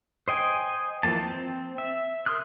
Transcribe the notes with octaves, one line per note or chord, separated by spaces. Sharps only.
C5 D#5 G5 G#5
E3 F3 G3 A#3 A5
C4
E5
A#4 C6 D#6 F6 F#6